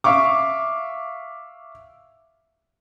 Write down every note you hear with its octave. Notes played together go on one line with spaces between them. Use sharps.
E5 F5 C#6 D6